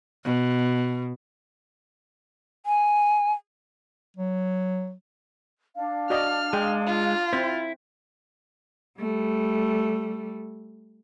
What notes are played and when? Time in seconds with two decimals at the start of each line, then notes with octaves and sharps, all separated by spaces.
0.25 B2
2.66 G#5
4.17 F#3
5.76 D4 F5
6.10 F#4 D5 D#5 F6
6.53 G#3 G#4 G5
6.87 F4
7.33 C4 E4 C5
8.99 G3 A3